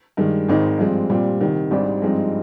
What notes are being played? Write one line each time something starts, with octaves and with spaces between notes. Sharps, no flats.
G2 D#3 G#3
G#1 G#2 D#3 G#3 D#4
G2 F3 G#3 C4
A#2 G3 C4
C2 C3 D#3
G#1 G#2 G3 D4
G2 F3 G#3 C4 D#4